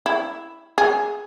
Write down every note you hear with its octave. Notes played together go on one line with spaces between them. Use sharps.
E4
G#4